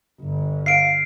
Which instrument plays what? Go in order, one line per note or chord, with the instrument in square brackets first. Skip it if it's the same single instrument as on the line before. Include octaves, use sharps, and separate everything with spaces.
[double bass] G1
[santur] F5 [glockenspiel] C7 D7